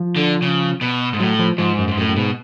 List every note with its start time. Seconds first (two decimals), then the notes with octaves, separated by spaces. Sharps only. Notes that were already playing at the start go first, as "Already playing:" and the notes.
Already playing: F3
0.16 D3
0.42 C#3
0.81 B2
1.13 G#2
1.20 A2 F#3
1.39 F3
1.58 G#2 F3
1.78 F#2
1.88 G#2
1.97 F#2 A2
2.09 F#2
2.16 G#2 B2